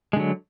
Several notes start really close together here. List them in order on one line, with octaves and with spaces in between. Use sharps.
G#3 D3 F#3